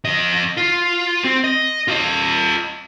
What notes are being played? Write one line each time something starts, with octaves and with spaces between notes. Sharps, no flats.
F2 D#5
F4
C4
D#5
F4 D#5